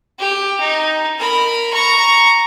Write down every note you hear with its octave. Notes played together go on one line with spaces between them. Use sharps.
G4
D#4
A#4 B5
A#5 C#6